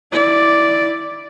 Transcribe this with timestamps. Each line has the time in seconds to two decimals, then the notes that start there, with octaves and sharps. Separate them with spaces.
0.12 E4 D5